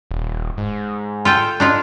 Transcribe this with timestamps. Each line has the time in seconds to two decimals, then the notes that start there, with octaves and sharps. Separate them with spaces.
0.11 D#1
0.58 G#2
1.25 F4 A4 G5
1.60 D4 D#4 F4